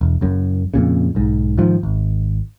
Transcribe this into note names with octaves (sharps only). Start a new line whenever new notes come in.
E1
F#1 F#2
F2 A#2 C#3
B1 G#2
G#2 D#3 F3
G#1